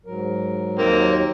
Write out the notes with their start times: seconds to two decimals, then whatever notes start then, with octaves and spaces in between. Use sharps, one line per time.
0.06 G#2 F#3 A#4
0.79 D#2 F#3 A#3 C4 D#4